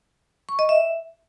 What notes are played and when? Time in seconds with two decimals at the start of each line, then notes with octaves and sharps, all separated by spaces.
0.49 C#6
0.59 D#5
0.69 E5